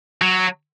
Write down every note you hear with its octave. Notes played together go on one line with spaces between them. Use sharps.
F#3